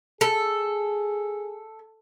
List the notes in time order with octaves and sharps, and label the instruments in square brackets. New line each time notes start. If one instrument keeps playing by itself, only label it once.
[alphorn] G#4 [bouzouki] A4